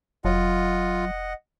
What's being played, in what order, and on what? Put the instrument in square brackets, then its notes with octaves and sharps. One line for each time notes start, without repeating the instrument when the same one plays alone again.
[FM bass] F1 [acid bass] F#3 [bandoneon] F4 [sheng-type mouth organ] D#5 F#5